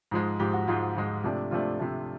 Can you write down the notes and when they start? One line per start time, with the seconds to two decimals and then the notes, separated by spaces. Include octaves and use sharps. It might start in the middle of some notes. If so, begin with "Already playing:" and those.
0.11 G#2 F3 G#3
0.39 G#2 F3 G#3 G4
0.53 F#4
0.68 G#2 F3 G#3 F4
0.96 G#2 F3 G#3
1.24 C3 F3 A3 D4
1.51 C3 F3 A3 D4 F4
1.79 C3 F3 A3 D4